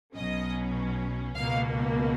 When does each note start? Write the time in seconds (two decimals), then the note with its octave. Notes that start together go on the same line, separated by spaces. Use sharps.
0.15 B1 B2 F#3 C#4 D#5
1.35 C#2 B2 A#3 F5